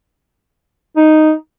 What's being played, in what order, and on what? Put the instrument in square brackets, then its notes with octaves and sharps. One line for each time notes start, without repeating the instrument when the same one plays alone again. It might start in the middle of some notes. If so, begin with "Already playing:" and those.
[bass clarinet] D#4